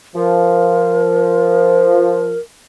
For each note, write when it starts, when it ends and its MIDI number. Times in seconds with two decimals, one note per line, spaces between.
0.16 2.34 53
0.16 2.38 70